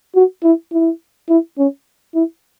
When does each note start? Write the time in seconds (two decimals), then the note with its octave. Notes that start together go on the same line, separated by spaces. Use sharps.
0.15 F#4
0.44 E4
0.72 E4
1.29 E4
1.58 C#4
2.15 E4